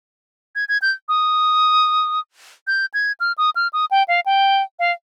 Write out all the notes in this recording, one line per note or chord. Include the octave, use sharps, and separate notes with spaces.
G#6
G#6
G6
D#6
G6
G#6
F6
D#6
F6
D#6
G5
F5
G5
F5